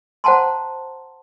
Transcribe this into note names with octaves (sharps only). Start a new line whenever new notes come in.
C5 F#5 G5 A5 A#5 C6